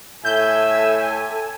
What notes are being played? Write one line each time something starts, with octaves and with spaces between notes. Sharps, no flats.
A2 A4 E5 G#5 G6